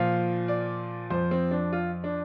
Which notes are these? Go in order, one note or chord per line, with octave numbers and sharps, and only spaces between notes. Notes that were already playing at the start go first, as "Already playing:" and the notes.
Already playing: A#2 F3 F5
D5
F2 F3 C5
C4
D4
F4
D4